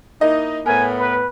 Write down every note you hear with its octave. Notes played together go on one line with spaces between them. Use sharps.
A#3 D#4 E4 D#5
A2 B3 A#4 G#5
B4